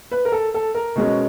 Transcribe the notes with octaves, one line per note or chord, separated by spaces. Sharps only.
B4
A#4
A4
A4
A#4
B2 G#3 C#4